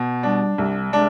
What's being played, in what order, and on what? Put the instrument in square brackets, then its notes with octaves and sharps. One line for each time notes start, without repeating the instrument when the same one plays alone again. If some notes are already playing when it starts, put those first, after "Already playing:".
Already playing: [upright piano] B2
[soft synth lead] G3 [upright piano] D4
[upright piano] C2 [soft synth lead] G3
[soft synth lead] G#3 [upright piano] D4